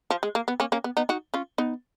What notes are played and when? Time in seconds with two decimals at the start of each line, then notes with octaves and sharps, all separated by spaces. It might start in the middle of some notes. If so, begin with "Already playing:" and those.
0.10 F3
0.23 G#3
0.35 A#3
0.48 B3
0.60 A#3 C#4
0.72 A#3 C#4
0.84 B3
0.97 B3 D#4
1.09 D#4 F#4
1.34 C#4 F4
1.58 B3 D#4